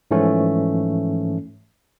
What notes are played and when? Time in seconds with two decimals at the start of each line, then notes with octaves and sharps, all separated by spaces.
0.11 G#2 E3 F3 A3 C#4